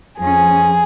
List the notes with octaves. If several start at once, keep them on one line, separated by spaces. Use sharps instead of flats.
F2 F3 C#4 G#4